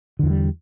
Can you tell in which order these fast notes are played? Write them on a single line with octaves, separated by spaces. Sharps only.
D3 E2 E3 G3